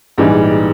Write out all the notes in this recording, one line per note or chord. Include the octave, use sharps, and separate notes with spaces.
A#1 G#2 E3 G3